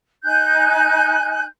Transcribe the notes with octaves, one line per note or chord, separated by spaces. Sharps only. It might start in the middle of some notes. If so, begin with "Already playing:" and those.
D#4 G#5 F#6 G6